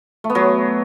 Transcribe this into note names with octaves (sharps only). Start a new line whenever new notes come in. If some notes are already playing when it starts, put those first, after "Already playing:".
A3
B3
F#3